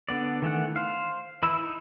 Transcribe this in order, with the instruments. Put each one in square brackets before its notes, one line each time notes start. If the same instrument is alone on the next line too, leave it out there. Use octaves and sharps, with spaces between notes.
[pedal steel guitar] D3 B3 D5
D#3 E3 A3 F#5
C5 F5
E3 E4 B5 E6
D#4